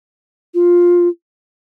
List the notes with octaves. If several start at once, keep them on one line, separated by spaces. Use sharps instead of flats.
F4